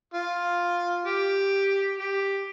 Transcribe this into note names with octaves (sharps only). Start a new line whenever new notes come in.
F4
G4
G4